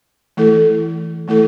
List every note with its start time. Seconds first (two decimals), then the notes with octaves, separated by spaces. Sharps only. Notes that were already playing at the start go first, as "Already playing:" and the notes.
0.37 E3 A3 E4 A4
1.28 E3 A3 E4 A4